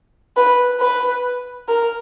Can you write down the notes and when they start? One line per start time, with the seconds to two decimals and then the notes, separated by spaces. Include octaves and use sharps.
0.37 B4
0.80 B4
1.68 A#4